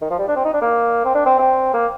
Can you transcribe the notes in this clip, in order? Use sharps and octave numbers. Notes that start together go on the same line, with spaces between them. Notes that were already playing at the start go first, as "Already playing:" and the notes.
D#3
F3
G3
D4
C4
D#4
D4
A#3
C4
D4
C4
C4
A#3